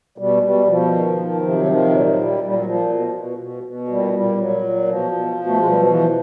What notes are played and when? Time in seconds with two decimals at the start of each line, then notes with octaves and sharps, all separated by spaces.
0.18 B2 G3
0.37 G#3
0.42 B2 G3
0.68 B2 F3
0.92 D#3
1.17 D#3
1.41 C3 F3
1.55 F#3
1.66 D#3 F3
1.91 A#2 F#3
2.06 F#3
2.15 A#2 G3
2.40 A#2 G3
2.54 F#3
2.65 A#2 F3
2.90 B2
3.14 B2
3.38 B2
3.63 B2
3.88 A#2 G3
4.13 A#2 G3
4.38 A#2 F#3
4.63 A#2
4.87 B2 F3
5.12 B2
5.36 B2
5.47 A3
5.57 B2 G#3
5.67 G3
5.76 F#3
5.86 E3 F3